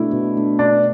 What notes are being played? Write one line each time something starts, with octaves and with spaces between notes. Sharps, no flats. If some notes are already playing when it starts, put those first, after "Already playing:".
Already playing: B2 A3 D4 E4
B2
A3 D4
B2 D4